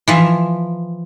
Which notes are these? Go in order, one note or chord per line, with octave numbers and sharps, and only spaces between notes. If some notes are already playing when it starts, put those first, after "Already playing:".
E3 F3 E5